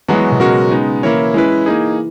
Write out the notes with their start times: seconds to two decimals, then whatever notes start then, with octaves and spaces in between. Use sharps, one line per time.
0.08 E3 F#3 G#3 B3 F#4
0.32 B2
0.40 C#3 G#3 C#4 F#4 A#4
0.71 G#3 B3 D#4
1.03 E3 A#3 E4 A#4 C#5
1.34 E3 G#3 C#4 E4 B4
1.66 A#3 D#4 G#4